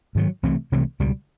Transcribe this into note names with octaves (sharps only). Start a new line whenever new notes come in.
G#2 D#3 F#3
C2 C3 E3 A3
C2 C3 E3 A3
C#2 B2 G3